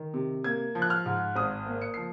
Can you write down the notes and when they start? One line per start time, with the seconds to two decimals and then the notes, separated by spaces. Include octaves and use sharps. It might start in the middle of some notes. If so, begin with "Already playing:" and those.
Already playing: D#3
0.14 C3
0.44 A#3 G#6
0.75 F3
0.82 F#6
0.90 F6
1.06 G#2
1.35 G#1 D#6
1.66 A#3
1.82 C#7
1.94 F3 C7